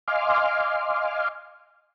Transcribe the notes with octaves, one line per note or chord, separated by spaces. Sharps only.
D#5 F5 G#5 C6 D6 F6